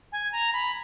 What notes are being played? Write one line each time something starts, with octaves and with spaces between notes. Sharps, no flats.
G#5
A#5
B5